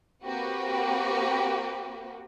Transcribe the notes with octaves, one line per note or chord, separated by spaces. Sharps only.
A#3 C4 F#4 G4 B4